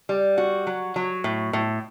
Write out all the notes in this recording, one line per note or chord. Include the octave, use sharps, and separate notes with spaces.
G3
F#4
F#3
F#3
A2
A2